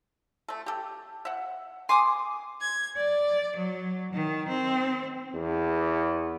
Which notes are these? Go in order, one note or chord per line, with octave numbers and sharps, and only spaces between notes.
A3 A4
G4 A4
E5 F#5
G#5 C6 D6 D#6
G#6
D5
F#3
D#3
C4
E2